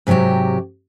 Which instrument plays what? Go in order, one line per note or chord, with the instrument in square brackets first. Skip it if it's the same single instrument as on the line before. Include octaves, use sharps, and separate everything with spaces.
[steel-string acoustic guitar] G#2 C3 E3 F#3 G4